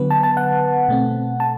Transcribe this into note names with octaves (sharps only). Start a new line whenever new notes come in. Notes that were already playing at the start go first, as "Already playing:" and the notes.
Already playing: D3 F#3 B3 B4
A5
A5
F#5
B2 A3 C4
A5